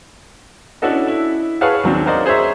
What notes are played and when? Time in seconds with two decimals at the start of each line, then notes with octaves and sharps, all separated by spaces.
0.82 C#4 D4 E4 F#4 A4 D#5
1.07 E4
1.61 G#4 B4 C#5 F5 F#5 A5
1.83 D#2 F#3 C4 D4
2.06 F#4 A#4 C5 D5 D#5
2.26 G#4 C5 C#5 E5 A#5